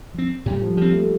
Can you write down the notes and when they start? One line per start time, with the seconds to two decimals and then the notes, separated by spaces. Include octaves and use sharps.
0.14 F3 C4
0.46 A2 G3
0.62 F3
0.77 F3 G3 C4
0.93 A3